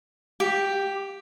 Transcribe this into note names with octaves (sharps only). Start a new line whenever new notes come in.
G4